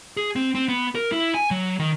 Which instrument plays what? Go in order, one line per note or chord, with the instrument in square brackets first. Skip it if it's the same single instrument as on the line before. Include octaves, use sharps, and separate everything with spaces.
[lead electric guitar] G#4
C4
C4
B3
A#4
E4
G#5
F#3
D#3